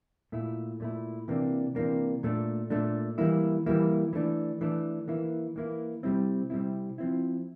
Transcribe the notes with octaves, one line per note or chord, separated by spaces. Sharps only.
A#2 A3 E4
A#2 A3 E4
C3 E3 A#3 D4
C3 E3 A#3 D4
A#2 A3 D4
A#2 A3 D4
E3 G3 A#3 E4
E3 G3 A#3 E4
E3 A3 D4
E3 A3 D4
E3 A#3 E4
E3 A#3 E4
C3 G3 C4 E4
C3 G3 C4 E4
F3 C4 E4